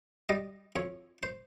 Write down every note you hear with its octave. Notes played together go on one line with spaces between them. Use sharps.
G3 D#5
F2 C#5
C5